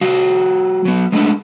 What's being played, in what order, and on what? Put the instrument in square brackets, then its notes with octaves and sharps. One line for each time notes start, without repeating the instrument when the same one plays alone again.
[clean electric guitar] G3 F#4 F5
F#3 B3
G#3 A3 B3 D4 E4